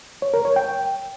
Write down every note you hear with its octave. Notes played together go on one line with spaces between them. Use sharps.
C#5
A#4
C#5
G5